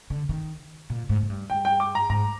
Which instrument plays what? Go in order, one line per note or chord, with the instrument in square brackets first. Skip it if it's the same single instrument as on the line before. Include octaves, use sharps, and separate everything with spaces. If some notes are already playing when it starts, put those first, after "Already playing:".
[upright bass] D3
D#3
A#2
G#2
G#2
G2
[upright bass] G2 [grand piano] G5
[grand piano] G5
D6
A#5
[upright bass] G#2 [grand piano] A#5